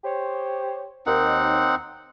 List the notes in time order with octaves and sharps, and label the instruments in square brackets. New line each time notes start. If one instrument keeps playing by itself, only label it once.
[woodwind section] G4 C5 C#5
[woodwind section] D#2 [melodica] C4 D#4 F#5